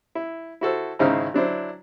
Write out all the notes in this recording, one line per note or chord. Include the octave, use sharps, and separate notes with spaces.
E4
E4 F#4 A4 C5
G#1 C#3 D#4 E4 C5 F6
F#3 D4 E4 C5